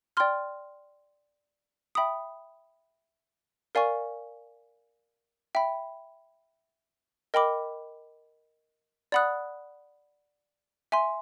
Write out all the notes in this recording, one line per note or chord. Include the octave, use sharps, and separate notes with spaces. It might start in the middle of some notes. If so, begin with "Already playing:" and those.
D5 G5 C6 F6
E5 G5 B5 D#6
A#4 D5 F5 G#5 C#6
E5 G5 B5
A#4 D#5 G5 B5 D6
D5 F#5 B5 D#6 F#6
E5 G#5 C6